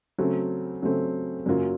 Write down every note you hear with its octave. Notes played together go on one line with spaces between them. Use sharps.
C#3 F#3 A3 C4
C#3 F#3 A3 C4
F#2 C#3 F#3 A#3 F4